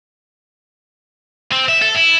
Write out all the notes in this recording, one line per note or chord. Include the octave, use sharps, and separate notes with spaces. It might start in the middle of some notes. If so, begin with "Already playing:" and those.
C4
E5
A4
E4